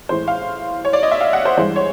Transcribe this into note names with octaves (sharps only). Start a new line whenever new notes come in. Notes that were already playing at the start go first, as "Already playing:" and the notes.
A2 E3 G#3 C5
F5
C#5
D5
D#5
E5
F5
F#5
C5
G2 E3 G#3 C5
C#5